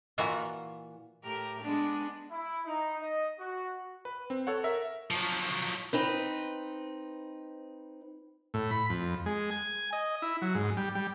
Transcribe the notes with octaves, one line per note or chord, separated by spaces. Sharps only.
A#2 E3 F4 F#4
A2 G4 A#4
G#3 B3 D4
E4
D#4
D#5
F#4
B4
C4
A4 C#5 F#5
A#4 E5
F3 F#3
C4 D#4 B4
A2
B5
F2
G#3
G#5
D#5
E4
F#3
G#2
G3
G3